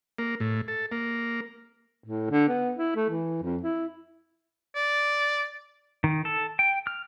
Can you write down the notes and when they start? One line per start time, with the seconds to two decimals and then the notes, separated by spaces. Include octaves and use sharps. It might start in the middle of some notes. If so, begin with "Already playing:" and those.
0.19 A#3
0.40 A2
0.68 A4
0.92 A#3
2.05 A2
2.31 D3
2.48 B3
2.77 E4
2.96 A3
3.10 E3
3.43 F2
3.63 E4
4.75 D5
6.04 D#3
6.25 A4
6.59 G5
6.87 F6